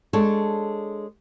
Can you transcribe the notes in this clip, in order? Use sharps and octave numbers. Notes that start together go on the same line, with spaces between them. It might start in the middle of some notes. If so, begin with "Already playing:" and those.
G#3 D4 A4 C#5